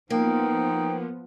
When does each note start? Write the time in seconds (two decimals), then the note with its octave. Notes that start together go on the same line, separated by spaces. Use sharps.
0.10 F3 A#3 B3 D#4 G5